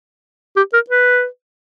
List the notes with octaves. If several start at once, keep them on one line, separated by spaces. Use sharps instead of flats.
G4
A#4
B4